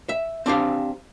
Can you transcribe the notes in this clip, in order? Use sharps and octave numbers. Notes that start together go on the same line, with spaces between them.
E5
C4 D4 G4 F5